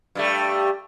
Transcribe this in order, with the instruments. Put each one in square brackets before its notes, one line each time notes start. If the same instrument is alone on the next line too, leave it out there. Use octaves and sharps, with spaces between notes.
[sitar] G2 G3 A3